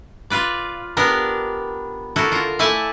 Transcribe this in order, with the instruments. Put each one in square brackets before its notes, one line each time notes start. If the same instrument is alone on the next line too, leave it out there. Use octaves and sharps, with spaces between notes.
[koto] F4 B4 D5
B3 D4 G4 A#4
D3 E4 F#4 A4 A#4
F4 A#4
A3 E4 D5 G#5 A5